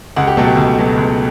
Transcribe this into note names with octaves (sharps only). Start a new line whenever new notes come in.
C#2 F#5
G4
B2 F#3 A3 A4
G4
C#2
B2 F#3 A3
C#2